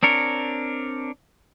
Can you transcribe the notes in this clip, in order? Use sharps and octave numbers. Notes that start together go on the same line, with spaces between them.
C4 D4 A#4 C#5